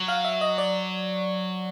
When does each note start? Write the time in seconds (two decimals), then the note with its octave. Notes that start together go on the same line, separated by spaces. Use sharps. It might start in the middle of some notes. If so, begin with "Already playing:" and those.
Already playing: F#3
0.08 F5
0.25 E5
0.41 D#5
0.58 D5